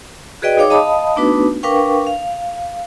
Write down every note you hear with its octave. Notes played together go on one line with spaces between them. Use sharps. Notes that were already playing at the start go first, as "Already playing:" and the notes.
F#4 G#4 B4 D5 D#5 G5
D#4 G#4 C#5 F5 G5 D6
D#5 F5 A5 B5 D#6
A3 B3 D4 D#4 F#4 B4
D4 A#4 B4 F5 G5 C#6
F5